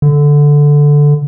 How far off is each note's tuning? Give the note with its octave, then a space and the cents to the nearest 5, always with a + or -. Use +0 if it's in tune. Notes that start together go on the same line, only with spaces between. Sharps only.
D3 -5